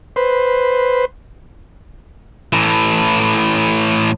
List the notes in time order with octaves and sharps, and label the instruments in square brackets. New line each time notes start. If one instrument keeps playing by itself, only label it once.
[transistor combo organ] B4 C5
[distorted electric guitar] A2 E3